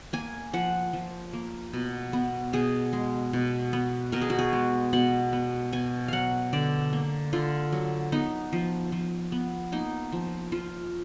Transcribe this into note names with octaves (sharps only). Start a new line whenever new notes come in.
A#3 G#5
F3 F#5
F3
A#3
B2
B3
B2 G#4
G#3
B2
B3
B2 A#4
G#4
F#4
G#4
G#3
B2 F#5
B3
B2 G#5
F#3 F5 F#5
D3 D5
A#3
D3 F4
F#3
B3 D#4
F3
F3
B3
A#3 D#4
F3
F3 F4